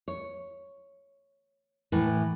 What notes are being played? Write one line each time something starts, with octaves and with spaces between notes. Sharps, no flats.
C#5
A2 E3